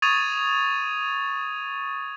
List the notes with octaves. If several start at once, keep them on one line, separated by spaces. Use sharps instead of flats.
C#6 D#6 G#6 A6 D#7 F7